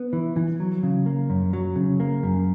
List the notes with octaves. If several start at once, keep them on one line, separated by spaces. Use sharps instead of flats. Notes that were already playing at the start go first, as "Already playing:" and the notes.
Already playing: B3
E3
E3
F#3
C#3
A#3
F#2
F#3
C#3
A#3
F#2